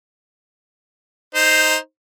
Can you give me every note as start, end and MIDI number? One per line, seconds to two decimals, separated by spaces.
1.35 1.76 63
1.35 1.76 72